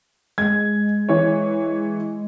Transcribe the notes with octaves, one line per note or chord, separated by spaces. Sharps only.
G#3 G#6
E3 C#5